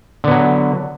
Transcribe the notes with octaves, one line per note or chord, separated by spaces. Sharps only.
D3 F#3 B3